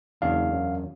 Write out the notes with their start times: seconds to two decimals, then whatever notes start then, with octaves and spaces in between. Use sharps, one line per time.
0.22 F#1 E2 C#3 D4 F5
0.52 F#2